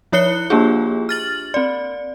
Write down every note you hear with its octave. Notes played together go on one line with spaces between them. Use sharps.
F3 E4 C#5 F#6 C#7 G7
A#3 D4 F4 G4 G#4
F6 A6 F#7
C4 D5